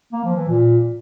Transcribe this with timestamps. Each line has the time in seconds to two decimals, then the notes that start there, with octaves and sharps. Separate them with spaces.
0.13 A#3
0.24 F3
0.36 E3
0.48 A#2